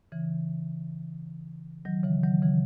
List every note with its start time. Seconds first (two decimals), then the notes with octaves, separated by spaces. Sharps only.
0.12 C#3 E3
1.85 D#3 F#3
2.04 C#3 E3
2.23 D#3 F#3
2.42 C#3 E3